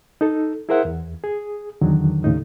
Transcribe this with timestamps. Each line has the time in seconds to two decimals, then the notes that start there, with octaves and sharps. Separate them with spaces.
0.21 D#4 A4
0.69 E4 G#4 A#4 C5 E5 F#5
0.85 E2
1.24 G#4
1.81 E2 D3 D#3 F#3
2.24 D#2 A2 C#3 D#4